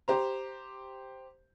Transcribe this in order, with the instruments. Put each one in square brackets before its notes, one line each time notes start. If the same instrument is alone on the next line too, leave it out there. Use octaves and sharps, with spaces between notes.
[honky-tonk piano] G4 C5 A#5